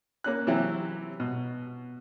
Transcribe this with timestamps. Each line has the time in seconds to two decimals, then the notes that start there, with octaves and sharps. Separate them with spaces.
0.24 A#3 C#4 F#6
0.47 C3 E3 F#3 E4 G4
1.20 B2